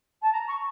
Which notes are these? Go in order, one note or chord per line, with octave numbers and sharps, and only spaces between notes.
A5
A#5
C#6